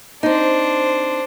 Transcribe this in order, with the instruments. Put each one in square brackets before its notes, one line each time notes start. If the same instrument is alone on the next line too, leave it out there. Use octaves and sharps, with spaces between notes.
[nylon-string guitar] C4 D#4 [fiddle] D4 C5